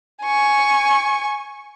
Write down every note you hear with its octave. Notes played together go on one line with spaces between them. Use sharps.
G#5 C#6